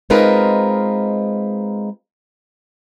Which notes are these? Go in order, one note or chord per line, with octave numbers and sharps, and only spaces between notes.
G#3 C4 D#4 F4 A#4 B4